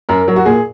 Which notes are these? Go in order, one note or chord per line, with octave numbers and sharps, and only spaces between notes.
F#2 A#4
F#3
F#4
A#2 G#4